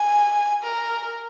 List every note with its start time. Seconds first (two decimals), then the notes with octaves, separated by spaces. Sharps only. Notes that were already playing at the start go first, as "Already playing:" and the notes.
Already playing: G#5
0.63 A#4